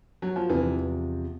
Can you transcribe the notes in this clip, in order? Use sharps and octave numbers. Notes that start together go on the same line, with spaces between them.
F#3
F3
E2 C3 E3 F3